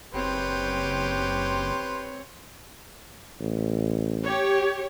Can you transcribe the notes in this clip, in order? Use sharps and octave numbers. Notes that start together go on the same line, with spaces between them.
F#1 C4 G4 B4 C#5 C6
A1
G4 C#5